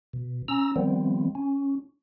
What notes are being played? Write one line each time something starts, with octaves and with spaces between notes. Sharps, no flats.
B2
C#4 A#5 E6
D#3 F3 G3 B3 C4
C#4